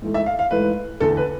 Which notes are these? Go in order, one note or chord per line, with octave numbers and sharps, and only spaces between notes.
G#2 E3 A3
E5
F5
F5
G#2 E3 A3 B4
E2 D3 A3 A4
B4